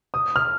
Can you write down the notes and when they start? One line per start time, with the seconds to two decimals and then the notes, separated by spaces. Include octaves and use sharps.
0.14 D#6
0.36 F6